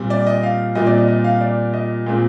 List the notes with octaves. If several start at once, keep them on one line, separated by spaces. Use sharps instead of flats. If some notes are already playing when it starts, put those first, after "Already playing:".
Already playing: A#2 G3 C4
D5
D#5
F5
A#2 G3 C4 D#5
D5
D#5
D#5
F5
D5
D#5
A#2 G#3 C4